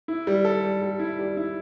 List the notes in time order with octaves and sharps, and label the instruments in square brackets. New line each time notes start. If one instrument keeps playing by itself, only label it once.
[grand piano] E4
G3
A4
G3
G3
E4
G3
E4